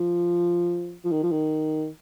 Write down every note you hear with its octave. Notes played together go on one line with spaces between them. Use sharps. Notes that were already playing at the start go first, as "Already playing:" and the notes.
Already playing: F3
F3
D#3
F3
D#3